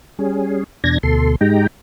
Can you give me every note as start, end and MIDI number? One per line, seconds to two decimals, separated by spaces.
0.19 0.64 55
0.19 0.64 61
0.19 0.64 68
0.84 0.98 40
0.84 0.98 47
0.84 0.98 62
0.84 0.98 92
0.84 0.98 94
1.03 1.36 38
1.03 1.36 47
1.03 1.36 69
1.03 1.36 84
1.41 1.67 44
1.41 1.67 56
1.41 1.67 63
1.41 1.67 67
1.41 1.67 79
1.41 1.67 82